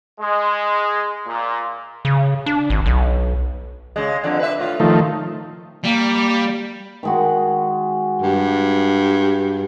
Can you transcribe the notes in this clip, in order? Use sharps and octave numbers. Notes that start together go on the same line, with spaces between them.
G#3
A#2
C#3
D4
G#1
B1
C#3 G#3
F2 D3
B4 E5
A2 F4
D#3 F3 A3
G3 A#3
D#3 G#3 F#4
G2